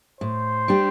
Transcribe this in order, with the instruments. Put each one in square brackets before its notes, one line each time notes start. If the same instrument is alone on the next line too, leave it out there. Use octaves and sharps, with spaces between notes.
[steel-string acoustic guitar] A2 [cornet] C5
[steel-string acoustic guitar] G3 D4 G4